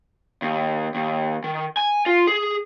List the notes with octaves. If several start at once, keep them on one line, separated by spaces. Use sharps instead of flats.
D#2
D#2
D#3
G#5
F4
G#4